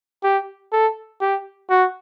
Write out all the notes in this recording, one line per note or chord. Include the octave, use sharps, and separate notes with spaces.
G4
A4
G4
F#4